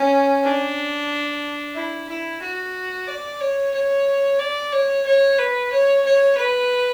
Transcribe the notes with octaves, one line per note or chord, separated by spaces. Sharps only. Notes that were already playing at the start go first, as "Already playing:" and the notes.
Already playing: C#4
D4
E4
E4
F#4
D5
C#5
C#5
D5
C#5
C#5
B4
C#5
C#5
B4